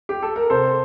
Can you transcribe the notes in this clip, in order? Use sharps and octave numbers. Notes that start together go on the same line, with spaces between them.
G4
A4
A#4
C3 A4 C5